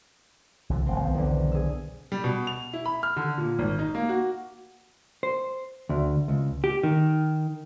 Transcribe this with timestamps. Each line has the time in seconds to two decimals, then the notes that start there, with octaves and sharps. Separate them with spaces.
0.70 C2 D3 F3
0.86 D#1 G#1 C3 C4
1.00 B1 D#3 B3
1.14 E2 D3
1.52 G#4 E6
2.12 G3
2.24 B2
2.47 F7
2.73 E4
2.86 B5
3.03 F6
3.17 D3
3.38 A#2
3.59 G#1
3.79 D#4
3.95 A#3
4.09 F#4
5.23 C5
5.89 D2
6.28 C#2
6.64 G4
6.83 D#3